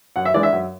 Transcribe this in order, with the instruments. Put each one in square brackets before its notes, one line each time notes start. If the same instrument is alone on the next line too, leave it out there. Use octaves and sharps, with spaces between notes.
[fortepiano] F#2 F#5
E5
E3 G#3 D4 D5
E5
F#2